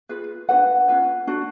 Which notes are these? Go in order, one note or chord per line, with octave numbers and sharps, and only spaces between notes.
F4 G#4 B4
D4 F#4 B4 F#5
C#4 F4 B4
D4 F#4